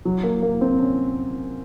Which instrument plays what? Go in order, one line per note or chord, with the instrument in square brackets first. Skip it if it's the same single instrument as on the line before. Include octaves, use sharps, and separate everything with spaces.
[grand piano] F#3
A#3
A#3
C4
C#4